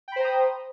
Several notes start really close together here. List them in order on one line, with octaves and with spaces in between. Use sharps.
G5 B5 C5 A#5 D#6